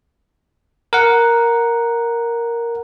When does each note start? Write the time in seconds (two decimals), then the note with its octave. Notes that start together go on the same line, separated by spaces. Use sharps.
0.93 A#4 F#5